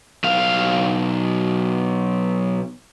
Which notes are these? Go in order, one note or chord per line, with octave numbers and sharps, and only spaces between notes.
B1 F5